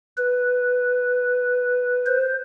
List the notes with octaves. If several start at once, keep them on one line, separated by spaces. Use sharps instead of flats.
B4
C5